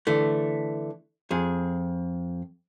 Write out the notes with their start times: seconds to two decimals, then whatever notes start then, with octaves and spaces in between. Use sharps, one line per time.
0.07 D3 E3 A3
1.31 F2 G#4